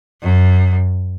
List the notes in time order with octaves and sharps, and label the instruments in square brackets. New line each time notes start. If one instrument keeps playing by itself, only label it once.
[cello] F#2